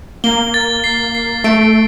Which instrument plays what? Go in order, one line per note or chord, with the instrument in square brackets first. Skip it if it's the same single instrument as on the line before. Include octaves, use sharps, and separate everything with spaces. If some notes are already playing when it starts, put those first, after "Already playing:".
[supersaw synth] A#3 [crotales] G7
[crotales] A6
C7
C7
[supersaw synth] A3 [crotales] D7